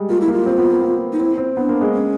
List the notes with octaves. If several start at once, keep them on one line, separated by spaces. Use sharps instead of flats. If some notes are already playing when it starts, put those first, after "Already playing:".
Already playing: G3 G#3
A#3 F4
E4
A#3
F4
C4
B3
A#3
B3
D#4
C4 E4
C4
B3 D4
A#3
G#3
C#4